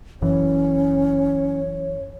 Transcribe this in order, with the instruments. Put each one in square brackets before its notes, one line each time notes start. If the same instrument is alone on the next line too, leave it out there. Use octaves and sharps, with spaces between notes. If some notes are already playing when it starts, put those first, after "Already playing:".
[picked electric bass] F#1 F#2 E3 [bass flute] C#4 [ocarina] C#5